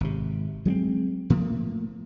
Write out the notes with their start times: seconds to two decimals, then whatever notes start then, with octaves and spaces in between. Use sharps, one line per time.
0.01 G#1 C3
0.65 F#3 G#3 B3 C4
1.30 A2 F3 A#3